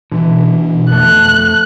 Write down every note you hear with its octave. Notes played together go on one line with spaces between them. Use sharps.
B2 D3 E3
F2 A3 A4 F#6